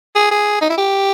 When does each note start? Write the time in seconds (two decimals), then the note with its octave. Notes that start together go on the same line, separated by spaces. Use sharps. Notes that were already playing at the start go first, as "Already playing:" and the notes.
0.15 G#4
0.31 G#4
0.61 D#4
0.70 E4
0.78 G4